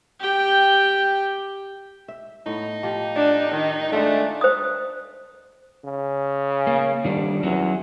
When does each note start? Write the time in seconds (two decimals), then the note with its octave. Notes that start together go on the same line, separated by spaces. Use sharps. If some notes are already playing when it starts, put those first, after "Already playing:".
0.20 G4 G5
2.08 E5
2.46 A2 B3 D#4
2.83 F3 G4
3.16 D4
3.52 D#3
3.92 G#3 A3 D4 D#4 F4
4.41 C5 D#6
5.84 C#3
6.67 A#3
7.05 F1 D#3 G3 D4
7.43 E2 F#3 C#4